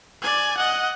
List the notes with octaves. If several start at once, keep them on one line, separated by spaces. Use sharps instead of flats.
D5 G#5
D#5 F#5